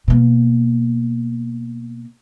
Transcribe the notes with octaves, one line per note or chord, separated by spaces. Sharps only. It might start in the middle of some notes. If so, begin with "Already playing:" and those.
B2 A#3